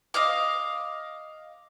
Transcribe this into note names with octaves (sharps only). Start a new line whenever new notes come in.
D#5 F5 D6